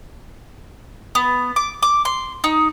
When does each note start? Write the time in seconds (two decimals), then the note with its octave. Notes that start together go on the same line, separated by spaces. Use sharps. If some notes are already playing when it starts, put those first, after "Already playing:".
1.15 B3
1.56 D6
1.83 D6
2.05 C6
2.44 D#4